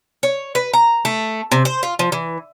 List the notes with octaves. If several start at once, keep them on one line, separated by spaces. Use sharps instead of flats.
C#5
B4
A#5
A3
C3
C5
F4
F3
E3